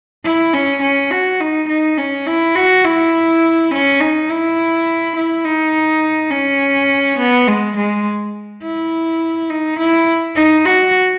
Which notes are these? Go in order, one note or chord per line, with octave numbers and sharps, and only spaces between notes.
E4
C#4
C#4
F#4
D#4
D#4
C#4
E4
F#4
E4
C#4
D#4
E4
E4
D#4
C#4
B3
G#3
G#3
E4
D#4
E4
D#4
F#4